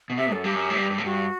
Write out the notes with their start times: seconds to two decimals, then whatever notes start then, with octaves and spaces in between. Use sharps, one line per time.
0.10 B2
0.18 C3 E5
0.32 F#2 A4
0.44 G2 G4
0.54 F#2
0.70 A2
0.76 G2
0.90 G2
0.98 A2
1.04 G2 F#4